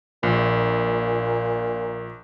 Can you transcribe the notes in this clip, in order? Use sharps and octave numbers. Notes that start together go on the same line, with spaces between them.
A#1 A#2